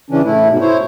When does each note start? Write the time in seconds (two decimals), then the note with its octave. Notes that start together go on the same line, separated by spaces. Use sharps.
0.10 C#3 E3 C#4 D4
0.24 A2 A3 E4
0.49 G#2 B2
0.61 E4 C5 C#5